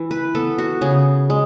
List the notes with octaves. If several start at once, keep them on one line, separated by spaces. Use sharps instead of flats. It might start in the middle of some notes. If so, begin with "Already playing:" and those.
Already playing: E3
B4
B3 A4
F#4
C#3 G#4
G#3